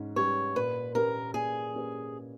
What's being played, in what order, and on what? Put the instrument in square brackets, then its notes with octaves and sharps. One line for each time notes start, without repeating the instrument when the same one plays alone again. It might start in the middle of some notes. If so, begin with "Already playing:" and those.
Already playing: [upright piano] G#2 C#4
[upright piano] G3 C#4 G4 B4 [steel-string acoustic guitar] C#5
[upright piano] A#2 [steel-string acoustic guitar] B4
[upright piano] A#3 C#4 G4 B4 [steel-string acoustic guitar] A#4
[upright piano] A#2 [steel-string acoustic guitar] G#4
[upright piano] A#3 C#4 G4 B4